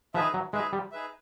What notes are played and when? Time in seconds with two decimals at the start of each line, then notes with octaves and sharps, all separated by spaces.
0.14 F3 D#4 G#4 B4 E5
0.34 F#3
0.53 G#3 D#4 G#4 B4 E5
0.73 G3
0.92 D#4 G#4 B4 E5